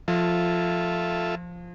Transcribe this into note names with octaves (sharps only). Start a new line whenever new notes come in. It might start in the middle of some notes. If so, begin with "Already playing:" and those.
F3 F4 A4 E5